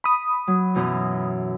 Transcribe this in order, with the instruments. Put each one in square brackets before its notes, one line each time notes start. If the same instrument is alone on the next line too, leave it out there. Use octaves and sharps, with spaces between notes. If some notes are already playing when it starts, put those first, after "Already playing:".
[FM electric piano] B5 D#6
[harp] F#3
F#2 B2 E3